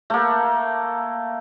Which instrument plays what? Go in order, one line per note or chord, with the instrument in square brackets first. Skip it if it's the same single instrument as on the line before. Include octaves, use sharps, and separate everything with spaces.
[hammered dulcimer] A3 A#3